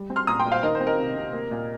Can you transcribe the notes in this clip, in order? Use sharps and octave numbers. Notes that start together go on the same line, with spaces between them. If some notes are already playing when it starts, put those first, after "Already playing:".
Already playing: G3
C4
C6 F6
A#2 A#5 D#6
G5 C6
A#2
C5 F5
D#3 A#4 D#5
C5
C4
A#4 D#5
C3
C3
A#3
A#2